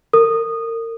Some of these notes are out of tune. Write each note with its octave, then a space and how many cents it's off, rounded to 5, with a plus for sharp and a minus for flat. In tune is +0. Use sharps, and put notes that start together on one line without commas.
A#4 -35 D#6 -15